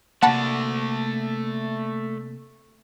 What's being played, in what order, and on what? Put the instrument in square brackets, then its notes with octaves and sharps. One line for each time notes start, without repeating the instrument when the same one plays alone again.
[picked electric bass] C3 A#3 [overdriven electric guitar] A3 D5 [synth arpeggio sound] F#5 A5 B5